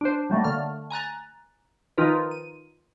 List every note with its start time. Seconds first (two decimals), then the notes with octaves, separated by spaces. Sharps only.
0.01 D4 C5
0.30 F#3 G3 A3 A#3
0.44 D3 A3 F6
0.90 G#5 A#5 F#6 A6
1.98 D#3 F3 D#4 F4 A#4 B4
2.31 D#7